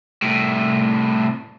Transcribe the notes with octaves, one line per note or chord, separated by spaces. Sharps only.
C2 A2